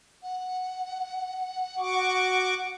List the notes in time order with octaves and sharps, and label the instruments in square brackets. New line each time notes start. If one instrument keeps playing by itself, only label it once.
[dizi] F#5
[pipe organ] F#4 C#6 D6